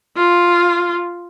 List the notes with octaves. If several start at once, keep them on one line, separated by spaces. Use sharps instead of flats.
F4